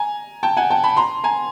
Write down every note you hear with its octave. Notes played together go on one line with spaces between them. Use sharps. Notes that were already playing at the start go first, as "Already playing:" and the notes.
Already playing: G#5 A#5
G5 A5
F#5 G#5
G5 A5
A5 B5
A#5 C6
G#5 A#5